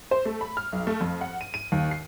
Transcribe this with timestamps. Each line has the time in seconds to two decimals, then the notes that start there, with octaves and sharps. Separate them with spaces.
0.11 C5
0.25 A3
0.41 B5
0.57 F6
0.72 B1
0.87 A3
1.01 F2
1.21 F#5
1.41 D#7
1.54 D#7
1.72 D#2
1.91 C7